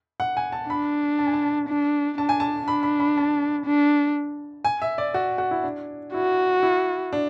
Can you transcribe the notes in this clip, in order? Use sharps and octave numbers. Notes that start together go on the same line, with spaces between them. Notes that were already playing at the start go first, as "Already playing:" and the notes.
F#5
G#5
A5
D4 B5
A5
G#5
A5
D4
D4 A5
G#5
A5
D4 B5
B5
B5
A5
D4
G#5
E5
D5
F#4
F#4
E4
D4
E4 F#4
E4
D4